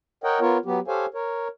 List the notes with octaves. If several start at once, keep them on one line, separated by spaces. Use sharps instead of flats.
A#4 C#5 D#5 F#5 G5
B3 F4 A#4 C#5
F#3 B3 G4
G4 A4 C5 C#5 F5 G#5
A#4 C#5